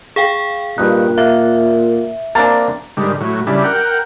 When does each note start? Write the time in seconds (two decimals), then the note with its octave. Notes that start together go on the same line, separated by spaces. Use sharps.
0.16 G#4 F5 G5
0.78 G2 A#2 D#4 F#6
1.18 A#3 E5
2.35 A#3 C4 D4 A#5 A6
2.97 G#2 D3 D#3 G3
3.20 A2 F#3
3.47 C#3 G3 D4 E4
3.64 A#4 F#5 G5